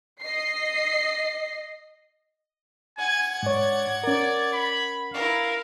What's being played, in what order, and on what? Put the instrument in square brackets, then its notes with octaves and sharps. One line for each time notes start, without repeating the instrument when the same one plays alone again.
[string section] D#5 C7
[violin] F#5 G#6 [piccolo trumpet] G#5
[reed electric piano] G#2 C#5 [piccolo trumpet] D5
[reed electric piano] C#4 A#4 [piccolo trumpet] D5
[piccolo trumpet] B5
[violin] E4 A#4 [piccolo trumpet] F5